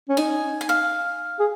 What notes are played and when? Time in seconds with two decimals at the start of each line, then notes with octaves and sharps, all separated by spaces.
0.09 C#4
0.17 D#4 G#5
0.61 G#5
0.69 F5
1.39 G#4